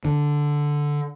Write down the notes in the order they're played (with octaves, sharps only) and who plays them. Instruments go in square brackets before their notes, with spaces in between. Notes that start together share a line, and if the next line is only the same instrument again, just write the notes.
[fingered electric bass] D3